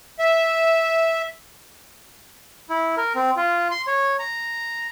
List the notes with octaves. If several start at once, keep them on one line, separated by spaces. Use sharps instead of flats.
E5
E4
A#4
C4
F4
C6
C#5
A#5